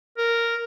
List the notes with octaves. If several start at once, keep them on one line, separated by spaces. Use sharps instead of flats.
A#4